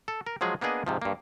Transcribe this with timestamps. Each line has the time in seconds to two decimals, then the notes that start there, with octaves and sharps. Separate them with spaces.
0.08 A4
0.27 A#4
0.41 F3 F#3 G#3 G#4
0.61 A#3 B3 D4 G#4 D#5
0.86 G#2 C3 F3
1.02 G2 A#3